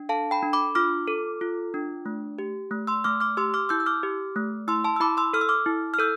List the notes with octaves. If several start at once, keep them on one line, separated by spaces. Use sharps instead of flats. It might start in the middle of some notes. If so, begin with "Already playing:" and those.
Already playing: D4
A4 F5 A5
G5 B5
D4
B5 D6
F4 D6 F6
A4
F4
D4
A3
G4
A3
C6 E6
A3 D6 F6
D6 F6
G4 C6 E6
D6 F6
E4 E6 G6
E6
D6 F6
G4
A3
E4 C6 E6
A5 C6
E6
E4 B5 D6
C6 E6
A4 F6
E6
D6 F6
E4
F6
A4 E6 G6